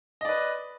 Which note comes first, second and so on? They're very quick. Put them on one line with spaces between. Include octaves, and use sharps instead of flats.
D#5 D5 B4